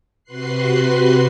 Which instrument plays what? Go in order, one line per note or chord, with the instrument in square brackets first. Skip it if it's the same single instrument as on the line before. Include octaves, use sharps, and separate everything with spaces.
[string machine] C3 F#4 B4 C6 F#6 C7